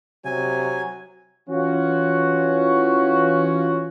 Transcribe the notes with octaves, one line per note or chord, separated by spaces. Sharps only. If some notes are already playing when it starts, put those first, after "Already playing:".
C3 F#3 G#5
E3 C#4 F4 F#4